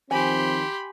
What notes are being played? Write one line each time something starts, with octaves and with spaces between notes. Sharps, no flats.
D#3 F3 C4 G4 G#5 B5 C6